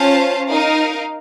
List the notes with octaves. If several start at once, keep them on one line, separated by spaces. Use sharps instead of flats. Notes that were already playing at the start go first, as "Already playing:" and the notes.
Already playing: C#4 F4 C5 F5 A5
D#4 A#4 F5